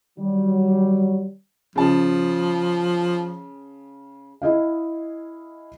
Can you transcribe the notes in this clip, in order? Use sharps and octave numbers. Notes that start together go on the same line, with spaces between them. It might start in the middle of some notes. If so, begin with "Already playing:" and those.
D#3 F#3 G3
C#3 F3 A5
E4 G#4 D#5 F5